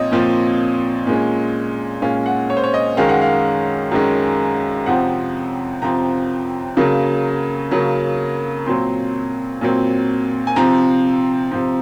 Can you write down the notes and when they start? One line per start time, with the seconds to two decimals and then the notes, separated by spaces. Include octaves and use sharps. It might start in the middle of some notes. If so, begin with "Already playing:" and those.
Already playing: A#2 F3 C4 C#5 D#5
0.12 A#2 F3 C4
1.07 A#2 G#3 C#4
2.02 A#2 G#3 C#4 F5
2.26 F#5
2.50 C#5
2.57 C5
2.64 C#5
2.74 D#5
2.97 F#2 D#3 G#3 C#4 F5
3.09 F#5
3.21 F5
3.92 F#2 D#3 G#3 C#4
4.86 F2 C3 F3 C4 F#5
5.82 F2 C3 F3 C4 A#5
6.77 C#3 F#3 A#3
7.71 C#3 F#3 A#3
8.66 A#2 F#3 C4 C6
9.61 A#2 F#3 C4
10.47 G#5
10.56 C3 F3 C4 A#5
11.51 C3 F3 C4